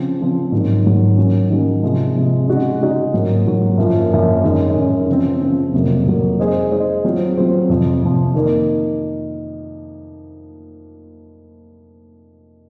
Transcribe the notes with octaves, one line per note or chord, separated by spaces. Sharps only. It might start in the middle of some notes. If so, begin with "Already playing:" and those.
Already playing: C#3 F3 C4
C#3 F3 C4
G#2 D#3 F#3
G#2 D#3 F#3
D#3 F#3 C#4
D#3 F#3 C#4
C3 F3 G#3
C3 F3 G#3
C#3 G#3 D#4 F#4
C#3 G#3 D#4 F#4
G#2 F#3 A#3
G#2 F#3 A#3
F#2 F3 A#3 F4
F#2 F3 A#3 F4
F#2 D#3 G#3 C#4
F#2 D#3 G#3 C#4
C#3 F3 C4
C#3 F3 C4
F2 C3 F#3 A#3
F2 C3 F#3 A#3
G#3 D#4 G#4 C5 D#5
G#3 D#4 G#4 C5 D#5
F#3 C4 F4 C5
F#3 C4 F4 C5
F2 C3 F3
F2 C3 F3
D#3 A#3 D#4